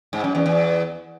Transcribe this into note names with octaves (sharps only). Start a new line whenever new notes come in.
G#2
F#2
E2
E2